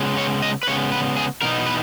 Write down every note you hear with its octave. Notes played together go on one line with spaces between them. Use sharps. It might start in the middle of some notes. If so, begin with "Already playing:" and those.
Already playing: C#3 G#3 B3
C#5
D#5
B4
C#3 G#3 B3 C#5
B4
G#4
E2 B2 B3 D#4 A#4
B4